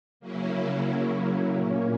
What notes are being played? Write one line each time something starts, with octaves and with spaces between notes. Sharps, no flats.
C#3 F#3 A#3 C#4 E4
A#2 A#3 C#4